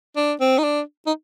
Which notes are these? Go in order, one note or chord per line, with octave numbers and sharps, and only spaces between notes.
D4
C4
D#4
D4
D#4